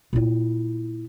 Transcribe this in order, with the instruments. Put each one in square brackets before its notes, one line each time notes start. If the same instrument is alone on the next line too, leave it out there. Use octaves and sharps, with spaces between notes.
[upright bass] A#2 E4